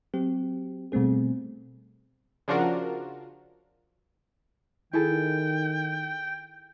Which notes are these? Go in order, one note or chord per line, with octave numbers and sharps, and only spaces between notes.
F#3 C4 G4
B2 G3 A3 C4 G#4
C#3 F3 D4 F4 F#4 A#4
D#3 E4 G#4 A4 G5